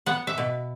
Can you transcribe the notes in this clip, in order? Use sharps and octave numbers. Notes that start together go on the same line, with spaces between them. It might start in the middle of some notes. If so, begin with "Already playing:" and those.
B3 F#5
E5
B2